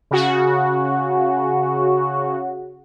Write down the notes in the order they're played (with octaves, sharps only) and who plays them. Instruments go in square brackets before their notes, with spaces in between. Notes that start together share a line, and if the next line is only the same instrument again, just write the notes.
[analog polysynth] C#3 F#4